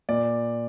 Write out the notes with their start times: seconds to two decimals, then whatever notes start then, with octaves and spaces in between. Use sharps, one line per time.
0.09 A#2 D5